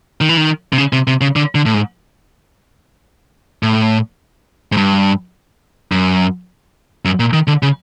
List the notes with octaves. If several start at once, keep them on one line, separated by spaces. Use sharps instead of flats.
D#3
E3
D#3
C3
C#3
C3
C3
C#3
D3
D3
A2
G#2
A2
G#2
G2
F#2
F#2
A#2
D#3
D3
C#3